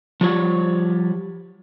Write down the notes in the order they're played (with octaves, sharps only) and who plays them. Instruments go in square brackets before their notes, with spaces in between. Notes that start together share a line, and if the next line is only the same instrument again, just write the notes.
[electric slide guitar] F3 G3 C#5